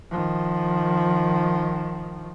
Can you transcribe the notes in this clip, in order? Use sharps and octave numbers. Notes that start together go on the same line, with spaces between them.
D#3 F3